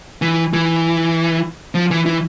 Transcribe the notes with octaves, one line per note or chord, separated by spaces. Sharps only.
E3
E3
F3
E3
E3